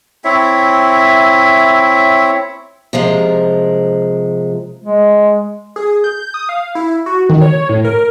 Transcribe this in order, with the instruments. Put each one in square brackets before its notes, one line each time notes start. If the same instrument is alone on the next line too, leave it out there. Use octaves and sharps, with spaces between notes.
[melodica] C4 E4 C#5 E5
[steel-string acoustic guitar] C3 F3 G#3 A#4
[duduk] G#3
[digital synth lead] G#4
G6
D#6
F5
E4
F#4
D#3
C#5
A2
A#4